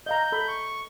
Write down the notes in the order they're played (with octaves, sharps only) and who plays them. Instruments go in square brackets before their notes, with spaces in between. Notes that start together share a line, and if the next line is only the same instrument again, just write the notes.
[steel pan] D#5 F5 A#5 [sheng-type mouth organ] G6
[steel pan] A4 B5
[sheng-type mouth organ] C#6